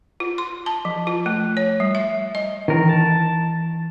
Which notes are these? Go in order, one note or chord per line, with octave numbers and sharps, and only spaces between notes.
F4
C6
A5
F3
F4
A3
C#5
G3
E5
D#5
D#3 E3 A#4
A5